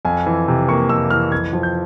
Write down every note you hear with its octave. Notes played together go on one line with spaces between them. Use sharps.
F2 G#5
E3
C3
A#3 C#6
F2 E6
E3 F6
F2 G#6
F3
G6